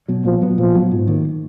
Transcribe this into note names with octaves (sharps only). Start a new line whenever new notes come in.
B2 F#3
A#2 F3
F#3 B3
A#2 F3
F#3 B3
G#2
D#3 A#3